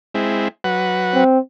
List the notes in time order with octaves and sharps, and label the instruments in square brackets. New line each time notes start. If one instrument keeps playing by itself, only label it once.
[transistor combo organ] G#3 C4 E4
F#3 B4 F#5
[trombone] C4